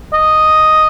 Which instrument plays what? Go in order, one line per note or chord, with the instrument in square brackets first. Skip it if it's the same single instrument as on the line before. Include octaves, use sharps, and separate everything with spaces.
[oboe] D#5